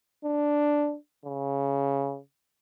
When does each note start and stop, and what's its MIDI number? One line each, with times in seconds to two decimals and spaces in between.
0.24 0.96 62
1.25 2.19 49